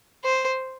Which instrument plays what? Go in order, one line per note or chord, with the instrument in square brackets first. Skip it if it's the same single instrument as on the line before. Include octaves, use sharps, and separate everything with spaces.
[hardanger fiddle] C5